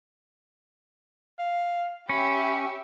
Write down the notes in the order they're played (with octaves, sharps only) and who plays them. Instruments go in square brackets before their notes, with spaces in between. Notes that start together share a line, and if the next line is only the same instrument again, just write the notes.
[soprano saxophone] F5
[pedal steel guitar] C#4 [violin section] G4 E5 [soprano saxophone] B5